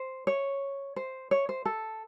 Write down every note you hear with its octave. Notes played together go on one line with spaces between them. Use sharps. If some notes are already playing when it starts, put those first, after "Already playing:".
Already playing: C5
C#5
C5
C#5
C5
A4